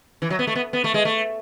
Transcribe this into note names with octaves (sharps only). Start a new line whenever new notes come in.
E3
F#3
B3
A3
B3
B3
A3
G#3
A3